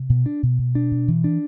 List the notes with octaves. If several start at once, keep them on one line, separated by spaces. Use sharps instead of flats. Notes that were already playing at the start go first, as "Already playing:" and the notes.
Already playing: C3
B2
D4
B2
B2
D4
B2
E3
D4